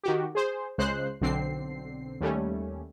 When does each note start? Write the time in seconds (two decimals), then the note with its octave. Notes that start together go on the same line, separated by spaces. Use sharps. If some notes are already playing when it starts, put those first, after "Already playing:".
0.04 D#3 F#4 G4
0.35 G#4 C5
0.78 C#2 C#3 G#3 C5 F#6 C7
1.21 B1 D3 C4 C7
2.21 D#2 G3 A3 C#4